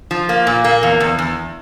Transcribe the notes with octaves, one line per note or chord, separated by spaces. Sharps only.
F3
A#3
A#2
A#3
E2
E2
E2